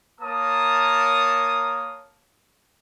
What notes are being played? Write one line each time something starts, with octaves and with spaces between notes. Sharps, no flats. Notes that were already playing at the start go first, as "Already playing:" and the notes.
A#3 A#4 C#5 A5 D#6